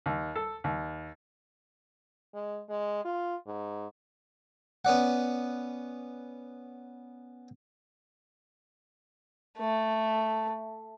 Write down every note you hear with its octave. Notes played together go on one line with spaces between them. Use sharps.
D#2
A4
D#2
G#3
G#3
F4
G#2
B3 C#4 D5 F#5
A3